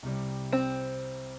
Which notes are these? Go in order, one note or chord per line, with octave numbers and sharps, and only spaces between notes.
C2 C3 G3
C4